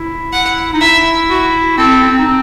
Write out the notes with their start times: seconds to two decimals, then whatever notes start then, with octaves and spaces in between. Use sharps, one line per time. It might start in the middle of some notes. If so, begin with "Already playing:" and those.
Already playing: E4
0.32 F#5
0.73 D#4
0.81 E4 E5
1.30 F#4
1.78 C4 A4
2.03 C4
2.18 D#4
2.26 C4